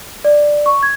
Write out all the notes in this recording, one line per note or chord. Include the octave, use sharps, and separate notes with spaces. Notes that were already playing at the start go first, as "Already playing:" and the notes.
D5
C#6
G#6